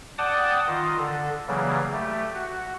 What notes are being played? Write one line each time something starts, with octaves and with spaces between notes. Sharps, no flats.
D5 F#5 G5 A5 D6 D#6
D#3 F4 D#5
D3 A4
C#3 E3 F#3 G3 A#3
A3 G4
F#4